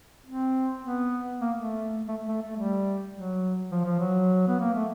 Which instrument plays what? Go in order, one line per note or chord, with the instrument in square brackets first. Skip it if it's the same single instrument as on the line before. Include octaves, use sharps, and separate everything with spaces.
[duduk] C4
B3
A#3
A3
A3
A3
A3
G3
F#3
F3
F3
F#3
B3
A#3
A3